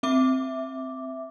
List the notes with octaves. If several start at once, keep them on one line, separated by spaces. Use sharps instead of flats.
C4 E5 D6